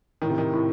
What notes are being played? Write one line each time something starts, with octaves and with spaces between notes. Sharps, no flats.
A2 D#3
C3
D#3
A2